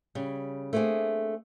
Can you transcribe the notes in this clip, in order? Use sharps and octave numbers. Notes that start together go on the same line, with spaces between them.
C#3 G3
A3 A#3 C4 D4 G#4